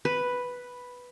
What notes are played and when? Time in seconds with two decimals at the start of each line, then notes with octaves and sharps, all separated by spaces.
0.05 B4